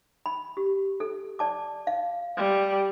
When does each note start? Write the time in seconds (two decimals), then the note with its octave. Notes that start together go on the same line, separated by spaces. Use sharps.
0.26 B5
0.57 G4
1.00 A4
1.39 D5 A5 D6
1.87 F5
2.37 G3